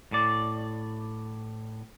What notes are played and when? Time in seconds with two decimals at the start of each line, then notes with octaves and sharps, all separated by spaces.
0.12 A2 D5